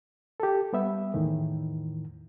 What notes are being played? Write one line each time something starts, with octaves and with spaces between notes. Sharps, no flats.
G4 A4
G3 B3 E5
E2 A2 D#3 E3